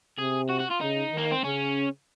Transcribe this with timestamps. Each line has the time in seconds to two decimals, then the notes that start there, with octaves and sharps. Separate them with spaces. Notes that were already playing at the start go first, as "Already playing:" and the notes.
0.19 C3 G#4
0.50 F#4
0.60 F#4
0.71 F4
0.81 C#3 D#4
1.12 D#3
1.17 A#3
1.31 C4
1.44 C#3 C#4